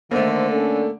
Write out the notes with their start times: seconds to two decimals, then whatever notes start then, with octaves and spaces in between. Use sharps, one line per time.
0.11 D3 D#3 A3 A#3 C5
0.51 C#4 D4 A4